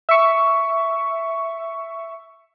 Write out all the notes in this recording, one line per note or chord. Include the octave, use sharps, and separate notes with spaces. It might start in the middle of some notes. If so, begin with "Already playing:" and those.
E5 C#6